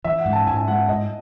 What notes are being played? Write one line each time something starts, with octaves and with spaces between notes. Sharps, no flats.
E3 E5
F#5
G#2
A5
G#2 G#5
G#5
G#3 F#5
G#2 D#5